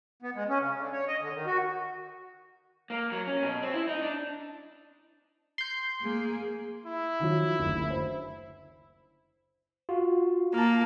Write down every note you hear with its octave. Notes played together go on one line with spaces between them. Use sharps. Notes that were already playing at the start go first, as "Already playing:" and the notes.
B3
G#3
C#4
C#3
D3
C#5
D#5
D3
D#3
F#4
A#3
F#3
C#4
B2
C4
E4
D#4
D4
C6 G6
A#3 G#4
E4
D#3 F3 F#3
F#1 D2
C5
F4 F#4
A#3 A5 F6